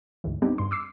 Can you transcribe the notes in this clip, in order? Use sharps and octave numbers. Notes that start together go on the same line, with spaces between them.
D2 G#2 E3
G3 B3 C4 D4 D#4 G4
G2 C6
D6 E6 C7